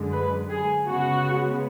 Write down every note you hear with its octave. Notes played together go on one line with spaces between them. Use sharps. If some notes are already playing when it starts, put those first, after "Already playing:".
Already playing: F#2 D3 G#3
B4
G#4
C#3 G#3 B3 F#4